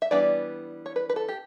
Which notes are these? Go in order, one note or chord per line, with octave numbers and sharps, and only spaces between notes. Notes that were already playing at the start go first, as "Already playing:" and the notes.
E5
E3 G3 B3 D4 D5
C#5
B4
B4
A4
G4